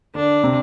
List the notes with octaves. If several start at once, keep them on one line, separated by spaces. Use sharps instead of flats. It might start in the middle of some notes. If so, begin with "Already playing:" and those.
D3 D4
C3